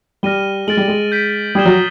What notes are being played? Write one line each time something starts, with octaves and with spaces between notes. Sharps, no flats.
G3 F6 A#6 D#7 G7
G#3 F6 A6 D7 F#7
G3
G#3
G6 B6 D7
G3 D#6 G#6 C7 E7 G7
F#3